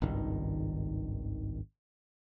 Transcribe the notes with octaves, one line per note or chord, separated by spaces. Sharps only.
G#1 C#2 G2 D#3